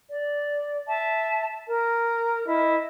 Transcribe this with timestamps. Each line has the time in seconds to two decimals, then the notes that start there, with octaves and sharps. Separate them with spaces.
0.09 D5
0.87 E5 A5
1.66 A#4
2.45 E4 D#5